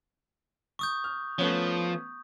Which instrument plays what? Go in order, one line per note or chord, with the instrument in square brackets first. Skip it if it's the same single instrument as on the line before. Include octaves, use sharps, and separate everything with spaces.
[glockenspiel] C#6 D#6 G6
[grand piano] F6
[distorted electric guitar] F3 [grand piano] A3 B3 C#4